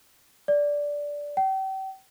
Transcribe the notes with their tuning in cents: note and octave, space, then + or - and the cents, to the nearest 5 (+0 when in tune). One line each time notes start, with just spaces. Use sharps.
D5 -10
G5 -35